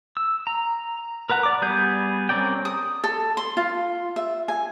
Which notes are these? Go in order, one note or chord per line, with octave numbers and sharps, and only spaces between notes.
E6
A#5
A#4 B4 F#5 A#5
D5 D6
G3 B3 G#4 G6
C4 C#4 A#4 D5 G5
D#6
A4
C6
F4
E5
G#5